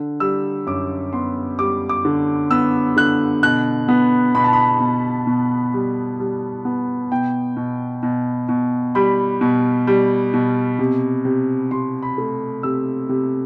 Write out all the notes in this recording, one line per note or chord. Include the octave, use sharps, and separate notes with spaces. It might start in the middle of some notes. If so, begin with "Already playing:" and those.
Already playing: D3
G3 E6
F#2 D6
B3 C6
G3 D6
D6
D3
B3 E6
D3 F#6
B2 F#6
B3
B2 B5
A5
B5
B2
B2
G3
G3
B3
B2 G5
B2
B2
B2
G3 B5
B2
G3
B2
C3
C3
C3 C6
B5
A3
C3 E6
C3